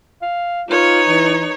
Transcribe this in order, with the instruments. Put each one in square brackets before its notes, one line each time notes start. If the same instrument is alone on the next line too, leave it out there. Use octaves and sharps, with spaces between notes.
[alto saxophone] F5
[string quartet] D#4 B4 C#5 [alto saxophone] F4
[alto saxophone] E3